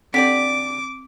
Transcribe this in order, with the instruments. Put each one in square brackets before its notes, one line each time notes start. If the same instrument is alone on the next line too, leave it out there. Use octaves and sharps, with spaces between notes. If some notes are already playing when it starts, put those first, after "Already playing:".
[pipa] D3 G4 D5 [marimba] C4 [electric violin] D6 [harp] B6